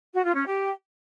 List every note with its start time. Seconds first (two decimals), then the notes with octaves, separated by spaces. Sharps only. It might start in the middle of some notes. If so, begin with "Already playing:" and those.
0.13 F#4
0.24 F4
0.35 C#4
0.46 G4